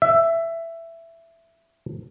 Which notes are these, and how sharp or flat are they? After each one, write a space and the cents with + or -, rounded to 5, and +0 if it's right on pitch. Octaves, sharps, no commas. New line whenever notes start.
E5 +10